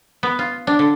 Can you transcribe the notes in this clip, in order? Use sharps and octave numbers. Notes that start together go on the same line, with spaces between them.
B3
F4
D4
D3